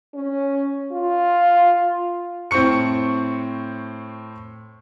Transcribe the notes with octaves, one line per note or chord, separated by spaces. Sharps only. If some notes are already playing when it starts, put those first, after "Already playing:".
C#4
F4
A2 C4 C5 C#6 C#7